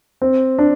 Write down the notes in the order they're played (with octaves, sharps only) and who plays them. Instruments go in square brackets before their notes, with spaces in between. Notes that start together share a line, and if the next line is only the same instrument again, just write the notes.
[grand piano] C4
D4